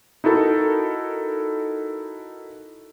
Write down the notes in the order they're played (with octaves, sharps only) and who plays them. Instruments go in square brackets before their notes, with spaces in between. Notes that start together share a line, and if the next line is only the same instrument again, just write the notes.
[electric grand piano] D#4 E4 F#4 A4 A#4